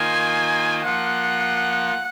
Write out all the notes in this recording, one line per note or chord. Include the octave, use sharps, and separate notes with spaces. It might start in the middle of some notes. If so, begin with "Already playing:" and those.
Already playing: D#3 A#3 F4 C5 D#5 G#5
F3 A#3 F4 F#5